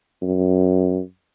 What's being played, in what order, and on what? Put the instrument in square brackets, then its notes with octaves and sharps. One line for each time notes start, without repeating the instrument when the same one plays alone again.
[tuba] F#2